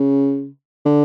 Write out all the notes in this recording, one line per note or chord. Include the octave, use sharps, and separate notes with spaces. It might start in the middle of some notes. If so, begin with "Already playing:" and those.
Already playing: C#3
D3